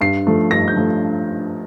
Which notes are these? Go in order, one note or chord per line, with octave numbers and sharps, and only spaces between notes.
G2 C7
F3 A3
G2 A#6
G6
F3 A3